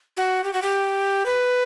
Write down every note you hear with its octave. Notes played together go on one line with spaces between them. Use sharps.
F#4
G4
F#4
G4
B4